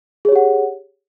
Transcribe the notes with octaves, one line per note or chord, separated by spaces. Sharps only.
G4 G#4 C#5 F#5